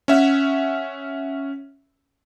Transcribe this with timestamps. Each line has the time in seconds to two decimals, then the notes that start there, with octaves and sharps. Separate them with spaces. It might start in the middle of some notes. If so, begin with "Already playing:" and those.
0.08 C#4 E5 F#5